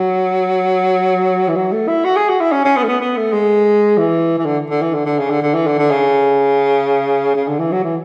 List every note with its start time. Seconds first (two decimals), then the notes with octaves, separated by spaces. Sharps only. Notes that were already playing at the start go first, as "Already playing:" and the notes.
Already playing: F#3
1.48 E3
1.56 F#3
1.72 A3
1.88 E4
2.04 F#4
2.16 G#4
2.29 F#4
2.40 E4
2.52 C#4
2.65 C#4
2.77 B3
2.83 A3
2.88 B3
3.01 B3
3.17 A3
3.33 G#3
3.98 E3
4.38 E3
4.46 D3
4.70 D3
4.82 E3
4.94 D3
5.06 D3
5.19 C#3
5.30 D3
5.42 D3
5.55 E3
5.67 D3
5.78 D3
5.91 C#3
7.35 C#3
7.48 D3
7.60 E3
7.72 F#3
7.84 E3